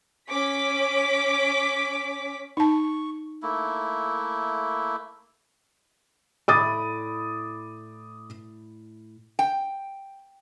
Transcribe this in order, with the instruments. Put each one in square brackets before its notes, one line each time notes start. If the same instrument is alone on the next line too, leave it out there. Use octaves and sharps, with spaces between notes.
[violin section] C#4 D6 B6
[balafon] D#4 A5 [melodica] C#6
[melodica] A3 A#3 E4
[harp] A2 D5 B5 [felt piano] D6 D#6 A6
[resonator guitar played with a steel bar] G5